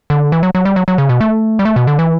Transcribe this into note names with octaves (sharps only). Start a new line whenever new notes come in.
D3
E3
F#3
F#3
G3
F#3
F#3
C#3
B2
A3
G3
A3
B2
D3
E3